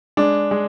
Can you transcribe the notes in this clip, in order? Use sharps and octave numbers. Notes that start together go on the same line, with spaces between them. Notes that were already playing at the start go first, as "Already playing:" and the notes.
G#3 D4
G#3